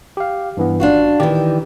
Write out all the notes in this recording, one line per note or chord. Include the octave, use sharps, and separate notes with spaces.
G4 F5
G2 E3 B3
G#1 D4 F4 F#4
D#3 E3 G4 D5